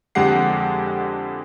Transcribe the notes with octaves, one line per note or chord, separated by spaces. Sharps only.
F2 D3 G#3 G4 F#5 C7